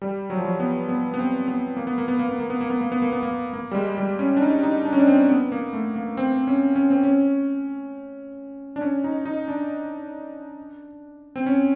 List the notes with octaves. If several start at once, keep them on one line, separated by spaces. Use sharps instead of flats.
G3
F#3
F3
F#3
B3
B3
B3
C4
B3
A#3
B3
A#3
B3
A#3
B3
A#3
B3
A#3
B3
A#3
B3
A#3
B3
A#3
A#3
G3
G#3
G3
C#4
D4
D#4
D#4
D4
C#4
D4
C4
B3
A#3
A3
A#3
C4
C#4
C#4
C4
C#4
D4
C#4
D#4
D#4
D4
C4
C#4